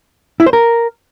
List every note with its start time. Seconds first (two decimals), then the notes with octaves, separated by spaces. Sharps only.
0.40 E4
0.46 C5
0.53 A#4